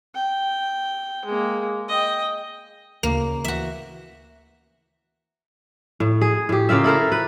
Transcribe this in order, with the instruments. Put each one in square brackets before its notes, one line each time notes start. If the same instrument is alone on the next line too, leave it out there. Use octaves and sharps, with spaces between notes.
[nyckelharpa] G5
G#3 A#3
D#5 G5
[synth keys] D2 C#3 [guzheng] A#3
[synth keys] E3 [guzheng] F#4 E5
[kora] A2
G#4
A2 G4
C#3 A#3 F4 E5
E4 A4 A#4 C5
B4